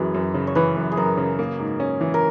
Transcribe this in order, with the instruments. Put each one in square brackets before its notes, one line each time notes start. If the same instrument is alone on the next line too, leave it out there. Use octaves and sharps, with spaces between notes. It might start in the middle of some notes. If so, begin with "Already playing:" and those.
Already playing: [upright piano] F#2 E3 [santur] F#4 G#4 B4
[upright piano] F#2
C#3
[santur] C#5
[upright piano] E3 [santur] B4
[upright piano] F#2
[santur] G#4
[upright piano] F#2 [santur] A#4
[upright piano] C#3
A#3
G#2
C#4
E3
[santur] A#4